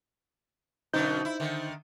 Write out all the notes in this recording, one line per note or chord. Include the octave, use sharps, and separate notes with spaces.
F#2 B2 D3 D#4 C5 G6
E4
D3 D#3